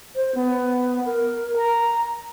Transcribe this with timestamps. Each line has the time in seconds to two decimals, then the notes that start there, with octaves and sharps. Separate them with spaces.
0.15 C5
0.35 B3
1.05 A#4
1.56 A#5